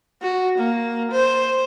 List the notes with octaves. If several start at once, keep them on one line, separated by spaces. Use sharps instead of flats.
F#4
A#3
C5